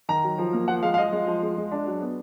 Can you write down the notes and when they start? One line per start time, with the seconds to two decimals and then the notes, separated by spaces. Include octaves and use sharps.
0.09 D#3 A#5
0.23 F#3
0.38 F3
0.53 A#3
0.68 F3 F#5
0.83 G#3 F5
0.94 F5
0.98 F3 D#5
1.12 G#3
1.27 F3
1.42 G#3
1.57 G#3
1.71 D4
1.86 F#3
2.01 B3